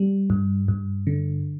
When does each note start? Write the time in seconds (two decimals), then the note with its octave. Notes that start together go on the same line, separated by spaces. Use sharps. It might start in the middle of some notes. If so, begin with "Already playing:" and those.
Already playing: G3
0.30 G2
0.68 G2
1.07 D3